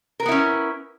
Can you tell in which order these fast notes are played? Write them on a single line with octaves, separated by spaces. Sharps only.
A#4 B4 B3 E4 C#4